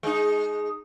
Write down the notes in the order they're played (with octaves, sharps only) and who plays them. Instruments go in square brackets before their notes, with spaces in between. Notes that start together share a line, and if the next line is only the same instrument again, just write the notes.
[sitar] G#3 D#4